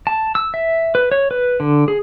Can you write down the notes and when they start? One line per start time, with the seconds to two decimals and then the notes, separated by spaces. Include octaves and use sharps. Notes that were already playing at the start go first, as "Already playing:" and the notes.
0.07 A5
0.35 E6
0.54 E5
0.95 B4
1.12 C#5
1.31 B4
1.60 D3
1.88 G#4